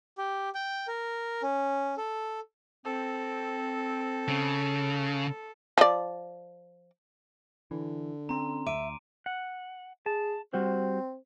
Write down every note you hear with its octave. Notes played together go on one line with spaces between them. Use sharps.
G4
G5
A#4
C#4
A4
C4 A4
C#3
F3 D5
D3 E3
C4 C#4 A#5 C6
D2 E5 D6 D7 D#7
F#5
G#4 A5
G3 C4 F#4 C5